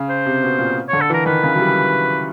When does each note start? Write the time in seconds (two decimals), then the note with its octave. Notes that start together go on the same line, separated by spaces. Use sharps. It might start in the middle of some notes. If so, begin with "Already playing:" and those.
Already playing: C#3
0.09 C5
0.26 C3
0.43 B2
0.59 A#2
0.89 D3 C#5
1.01 A4
1.10 E3
1.14 A#4
1.26 D#3 B4
1.43 C#3
1.55 F#3
1.60 G3